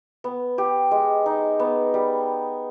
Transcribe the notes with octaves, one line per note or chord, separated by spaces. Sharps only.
B3
G4
G#3
D#4
B3
G3